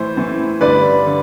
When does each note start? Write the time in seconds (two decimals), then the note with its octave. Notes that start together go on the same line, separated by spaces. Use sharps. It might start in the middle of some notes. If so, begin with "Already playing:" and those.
Already playing: A2 E3 C5
0.17 A2 E3
0.61 G2 D3 B4 D5
1.06 D3